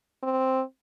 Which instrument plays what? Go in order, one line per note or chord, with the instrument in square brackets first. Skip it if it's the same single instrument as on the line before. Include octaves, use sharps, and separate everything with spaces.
[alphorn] C4